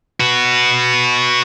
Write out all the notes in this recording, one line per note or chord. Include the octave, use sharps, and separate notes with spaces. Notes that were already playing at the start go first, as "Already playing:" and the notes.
F#4 B4